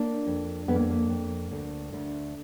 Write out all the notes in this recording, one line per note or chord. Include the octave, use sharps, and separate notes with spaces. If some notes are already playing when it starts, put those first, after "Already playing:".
Already playing: A#3 D4
F2
F2 B3
A#3
A#3
F2
D2
D2